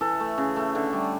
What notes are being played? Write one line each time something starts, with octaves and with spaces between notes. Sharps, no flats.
E3 A4
A3
C#3
A3
D3
G3